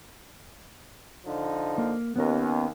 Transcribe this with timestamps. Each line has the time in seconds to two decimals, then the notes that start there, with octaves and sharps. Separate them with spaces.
1.26 D3 F3 D#4
1.78 A#3
2.16 D#2 B3 C#4 A#4